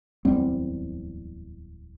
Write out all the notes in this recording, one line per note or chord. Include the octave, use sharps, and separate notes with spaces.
D1 E2 G3 C4